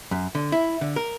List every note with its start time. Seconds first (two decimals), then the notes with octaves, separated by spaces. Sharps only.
0.11 F#2
0.35 D3
0.52 E4
0.81 D3
0.96 A#4